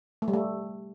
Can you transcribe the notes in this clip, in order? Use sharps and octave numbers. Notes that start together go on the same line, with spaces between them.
A3
G3
A3